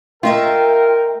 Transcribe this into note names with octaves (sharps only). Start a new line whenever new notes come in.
A3 F4 A#4 D#5 E5 G5